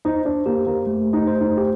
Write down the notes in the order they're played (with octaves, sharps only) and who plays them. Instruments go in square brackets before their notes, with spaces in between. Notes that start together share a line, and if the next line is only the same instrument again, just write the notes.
[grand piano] D#4 [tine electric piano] C5
[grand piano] D4
[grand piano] A#3 [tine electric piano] G4
[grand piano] A#3
[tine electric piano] A3
[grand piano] D#4
[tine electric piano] C5
[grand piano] D#4
G4